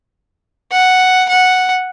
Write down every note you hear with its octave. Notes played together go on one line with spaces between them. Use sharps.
F#5
F#5